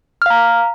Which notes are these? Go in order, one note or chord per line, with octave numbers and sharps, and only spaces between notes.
F5 A#5 F6